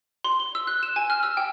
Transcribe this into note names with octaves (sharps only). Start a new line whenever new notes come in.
C6
G7
E6
F#6
E7
G#5
F6
E6
G5